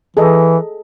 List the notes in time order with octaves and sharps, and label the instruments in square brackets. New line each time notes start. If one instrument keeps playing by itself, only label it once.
[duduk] E3 [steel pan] G#4 A4 D#5